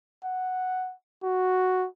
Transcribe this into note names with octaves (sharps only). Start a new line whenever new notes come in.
F#5
F#4